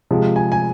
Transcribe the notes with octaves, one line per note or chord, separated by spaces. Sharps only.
C3 F3 G#3
G#5
G#5